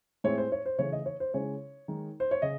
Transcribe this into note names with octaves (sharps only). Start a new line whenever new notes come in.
A2 G#3 C4 E4 C#5
C5
C#5
C5
C#3 E3 A3 C#5
D#5
C#5
C5
C#3 G#3 C#4 E4 C#5
D#3 G#3 D#4
C5
C#5
C#3 D#5